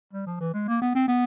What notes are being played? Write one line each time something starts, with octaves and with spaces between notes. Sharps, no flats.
G3
F3
E3
G#3
A#3
B3
C4
B3